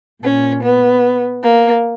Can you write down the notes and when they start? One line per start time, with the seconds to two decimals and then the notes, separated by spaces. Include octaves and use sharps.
0.23 A#2 C#4
0.62 B3
1.42 A#3